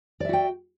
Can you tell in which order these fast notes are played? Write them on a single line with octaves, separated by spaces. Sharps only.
D5 E5 F#4 G5